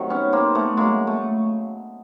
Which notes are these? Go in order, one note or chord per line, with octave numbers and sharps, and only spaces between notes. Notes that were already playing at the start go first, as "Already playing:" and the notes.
Already playing: C3 D#3 F#3
B3 C#4
A#3 C4
A3 B3
C#3 F#3 G#3 A#3
A3